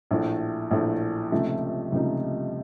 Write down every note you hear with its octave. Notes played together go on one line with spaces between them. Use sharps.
A#1 A2 A3
A#1 A2 A3
C#2 C3 F3 A3 D#4
C#2 C3 F3 A3 D#4